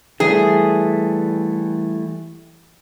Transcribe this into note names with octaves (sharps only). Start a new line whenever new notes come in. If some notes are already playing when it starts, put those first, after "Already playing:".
E3 G3 A3 G#4